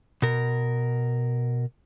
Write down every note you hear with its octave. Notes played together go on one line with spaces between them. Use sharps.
B2 A#4